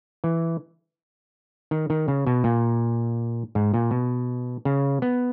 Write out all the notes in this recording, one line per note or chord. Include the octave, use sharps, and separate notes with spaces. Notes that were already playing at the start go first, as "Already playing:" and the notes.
E3
D#3
D#3
C#3
B2
A#2
G#2
A#2
B2
C#3
B3